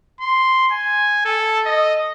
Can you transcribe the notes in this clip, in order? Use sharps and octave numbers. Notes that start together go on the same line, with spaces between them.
C6
G#5
A4
D#5